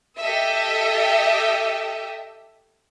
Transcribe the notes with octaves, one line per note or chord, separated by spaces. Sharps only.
G4 A4 D#5 E5